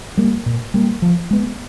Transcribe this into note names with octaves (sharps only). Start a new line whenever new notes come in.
G3 A#3
A#2
G3 A#3
F3
G#3 B3